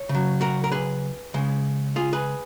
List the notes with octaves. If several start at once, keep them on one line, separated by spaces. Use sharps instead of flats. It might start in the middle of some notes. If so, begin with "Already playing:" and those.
Already playing: C#5
C#3
F#3
F#4 A#4
A#4
G#4 B4
C#3 G#3
F4 G#4
G#4 B4